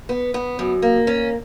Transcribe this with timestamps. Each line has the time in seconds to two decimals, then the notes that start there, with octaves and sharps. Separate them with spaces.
0.09 B3
0.34 B3
0.59 F#2
0.82 A#3
1.07 C#4